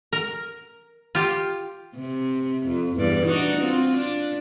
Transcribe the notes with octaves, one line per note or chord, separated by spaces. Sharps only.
A#4
F4 G4
C3
F2
E2 G2 D5
D4 D#4 F#4
C4 F4
D4